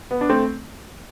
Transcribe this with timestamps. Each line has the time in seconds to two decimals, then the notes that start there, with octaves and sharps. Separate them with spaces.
0.11 B3
0.21 D4
0.29 A3 C4